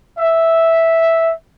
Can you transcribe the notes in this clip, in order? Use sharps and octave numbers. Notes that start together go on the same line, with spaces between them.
E5